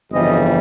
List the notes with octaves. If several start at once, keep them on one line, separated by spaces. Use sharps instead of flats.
G1 F2 C#3 E3 G3 D#5